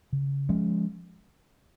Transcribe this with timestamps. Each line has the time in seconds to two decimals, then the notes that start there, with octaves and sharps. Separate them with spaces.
0.13 C#3
0.49 F3 G#3 C#4